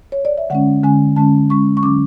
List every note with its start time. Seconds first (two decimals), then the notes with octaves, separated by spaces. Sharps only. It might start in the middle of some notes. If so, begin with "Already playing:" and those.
0.12 C#5
0.25 D5
0.38 E5
0.50 D3 G#3 C#4 F#5
0.83 D3 G#3 C#4 G#5
1.16 D3 G#3 C#4 A5
1.50 D3 G#3 C#4 C#6
1.77 C#6
1.83 D3 F#3 C#4 D6